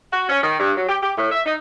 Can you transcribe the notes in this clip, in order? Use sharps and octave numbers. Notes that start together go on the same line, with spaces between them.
F#4
C#4
D#3
G2
F#3
G4
G4
A2
E5
D#4